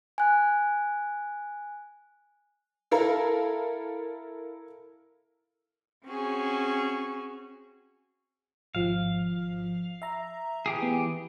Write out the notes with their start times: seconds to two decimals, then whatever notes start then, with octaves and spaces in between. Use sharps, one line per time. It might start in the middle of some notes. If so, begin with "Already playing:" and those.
0.18 G#5 F#6
2.91 E4 A4 A#4 F5 A#5
6.06 C4 C#4 F#4 G#4
8.75 G#1 F3 F5
10.02 E5 A#5
10.66 E3 G4 G#4
10.82 B3